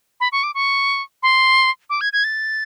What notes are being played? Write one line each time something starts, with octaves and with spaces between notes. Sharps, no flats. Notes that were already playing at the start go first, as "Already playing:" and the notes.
B5
C#6
D6
C#6
C6
D6
G#6
G#6
A6